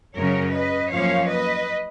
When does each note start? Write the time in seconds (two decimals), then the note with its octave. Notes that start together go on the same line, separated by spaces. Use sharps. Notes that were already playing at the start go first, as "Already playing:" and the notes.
0.17 F#2 C#3 F#3 C#4 A#4 C#5
0.54 B4 D#5
0.92 F#2 F3 A#3 C#4 C#5 F5
1.29 B4 D#5